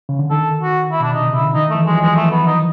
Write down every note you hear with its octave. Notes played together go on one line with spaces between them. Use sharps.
C#3
D3
D#3 A4
F#4
E4
B2 D4
C3 D#4
C#3
E4
D3
D#3 D#4
A3
E3
F#3 G#3
F3
G#3
F3 A3
B3
D#4